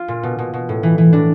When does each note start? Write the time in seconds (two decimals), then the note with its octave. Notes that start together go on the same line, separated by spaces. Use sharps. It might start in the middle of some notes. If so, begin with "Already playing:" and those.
Already playing: F4
0.08 A#2
0.23 B2
0.38 B2
0.54 B2
0.69 A2
0.83 E3
0.98 E3
1.13 A2 D4